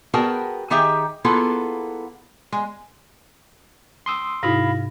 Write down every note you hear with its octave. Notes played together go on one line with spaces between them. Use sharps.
B3 F#4 G#4 A#4 G5 A5
D#3 D#4 G4 G#4 E5 G5
A#3 B3 E4 F4 G#4 A4
G#3
C6 D#6 E6
G#2 C3 D#4 E4 F#4 F5 B5 A#6